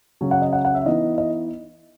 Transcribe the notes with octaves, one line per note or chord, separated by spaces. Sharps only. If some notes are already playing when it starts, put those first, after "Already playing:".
C#3 F#3 C#4
F#5
D#5
F#5
F#5
E5
E3 B3 D#4 D#5
D#5